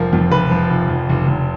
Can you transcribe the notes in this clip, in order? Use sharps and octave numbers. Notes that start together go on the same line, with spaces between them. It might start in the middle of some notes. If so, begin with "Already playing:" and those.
Already playing: F1 F3 A#4
F2
F1 B4
F3
F1
F1
F1
F1